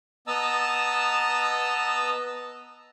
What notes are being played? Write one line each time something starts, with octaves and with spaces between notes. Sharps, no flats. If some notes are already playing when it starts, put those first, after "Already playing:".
B3 D#5 A5 A#5 E6